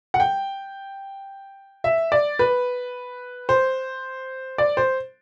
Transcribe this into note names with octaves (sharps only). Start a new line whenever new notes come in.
F#5
G5
E5
D5
B4
C5
D5
C5